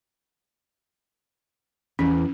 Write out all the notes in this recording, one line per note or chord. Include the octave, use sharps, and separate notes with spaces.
E2 E3 C#4